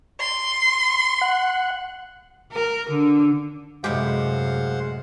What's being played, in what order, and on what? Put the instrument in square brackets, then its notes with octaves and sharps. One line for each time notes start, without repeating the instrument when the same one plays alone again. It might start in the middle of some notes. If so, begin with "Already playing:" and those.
[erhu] C6
[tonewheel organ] F#5
[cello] A#4
D3
[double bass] F#2 C3 [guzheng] A2 G4 [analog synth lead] G#3 [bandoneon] C5 F5 F#5